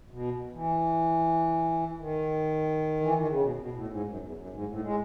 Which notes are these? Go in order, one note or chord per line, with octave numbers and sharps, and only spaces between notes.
B2
E3
D#3
E3
D#3
C#3
B2
B2
A2
G#2
F#2
E2
F#2
G#2
A2
G#3